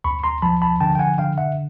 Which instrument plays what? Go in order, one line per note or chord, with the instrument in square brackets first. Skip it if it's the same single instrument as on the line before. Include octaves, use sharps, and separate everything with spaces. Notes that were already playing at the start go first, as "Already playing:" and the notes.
[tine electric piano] D2 B5 C#6
A#5 C6
F3 A5 B5
A5 B5
D3 G5 A5
G5
F#5 G#5
D3 F5 G5
E5 F#5